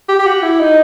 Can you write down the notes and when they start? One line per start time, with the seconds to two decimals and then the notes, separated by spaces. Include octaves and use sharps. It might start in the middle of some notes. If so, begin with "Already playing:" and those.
0.08 G4
0.19 G4
0.26 F#4
0.42 E4
0.60 D#4